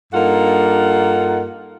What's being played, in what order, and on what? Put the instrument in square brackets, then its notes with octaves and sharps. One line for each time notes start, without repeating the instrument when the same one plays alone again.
[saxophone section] G2 A#3 D#4 F4 A4 F#5